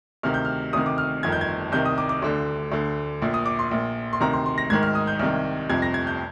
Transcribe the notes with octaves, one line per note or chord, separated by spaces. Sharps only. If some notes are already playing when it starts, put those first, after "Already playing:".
D2 C3 D#3 F6
G6
F6
D2 C3 D#3 D#6
D6
F6
G1 F2 D#3 G#6
G6
G#6
C2 C3 D#3 G6
D#6
D6
D6
D2 D3
D2 D3
A#1 A#2
D#6
D6
C6
A#1 A#2
C6
D2 C3 D#3 A#5
C6
C6
A#6
G#1 G#2 D#3 G#6
F6
D#6
G6
C2 C3 D#3 F6
G1 F2 C3 G#6
A#6
G#6
G6